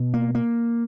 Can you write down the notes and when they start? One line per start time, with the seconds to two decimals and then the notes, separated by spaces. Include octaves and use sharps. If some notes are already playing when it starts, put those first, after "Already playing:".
Already playing: B2
0.14 A#3
0.35 A#3